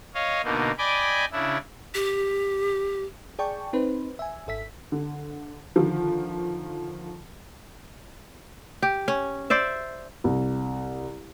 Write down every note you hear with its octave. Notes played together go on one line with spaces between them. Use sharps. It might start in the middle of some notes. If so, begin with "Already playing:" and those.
C#5 D#5 F5
B2 D3 A#3 D#4
D5 D#5 G5 G#5 B5 D6
C#3 D4 E4
G4
G#4 D5 G5 A5 C#6
C4 D#4 B4 C5
E5 G#5
G#1 A4 E5 B6
D3
D3 D#3 F3
G4
C#4
C5 D5 E5
C2